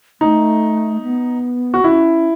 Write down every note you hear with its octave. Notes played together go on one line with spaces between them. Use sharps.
A3 D#4
B3
F#4
C#4 E4